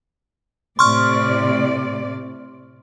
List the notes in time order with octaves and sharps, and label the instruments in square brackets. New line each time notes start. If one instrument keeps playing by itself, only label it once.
[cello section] A2 C3 D5 [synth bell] C6 C#6 F6